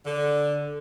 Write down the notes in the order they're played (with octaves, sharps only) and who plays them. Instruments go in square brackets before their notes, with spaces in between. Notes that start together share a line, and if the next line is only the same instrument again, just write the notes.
[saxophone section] D3